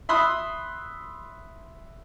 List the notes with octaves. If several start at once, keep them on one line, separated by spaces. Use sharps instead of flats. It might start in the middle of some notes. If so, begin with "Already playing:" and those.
E5 B5 C6 D#6 F#6